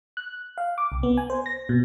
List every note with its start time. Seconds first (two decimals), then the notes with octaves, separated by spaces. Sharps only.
0.17 F#6
0.58 F5
0.78 D6
0.92 C2
1.03 B3
1.17 G#5
1.30 C5
1.46 A#6
1.69 B2